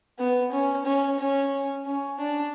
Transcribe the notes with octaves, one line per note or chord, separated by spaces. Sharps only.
B3
C#4
C#4
C#4
C#4
D4